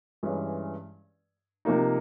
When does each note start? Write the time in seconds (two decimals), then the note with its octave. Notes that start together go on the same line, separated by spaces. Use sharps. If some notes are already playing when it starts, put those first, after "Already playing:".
0.23 G2 E3 G#3 C#4
1.65 C3 F3 A#3 D#4